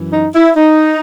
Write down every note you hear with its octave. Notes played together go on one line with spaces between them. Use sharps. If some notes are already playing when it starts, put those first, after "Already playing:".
Already playing: F#2 E3
D#4
E4
D#4